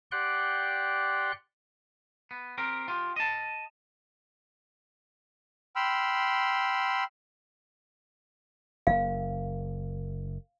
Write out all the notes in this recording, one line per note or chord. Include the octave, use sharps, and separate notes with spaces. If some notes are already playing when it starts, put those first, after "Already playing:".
G4 D5 F#5 G5 C6 F#6
B3
C4 G4 A#4
F4 G4
D#5 A5
G5 B5 C6 E6 F6
F#1 A#3 F5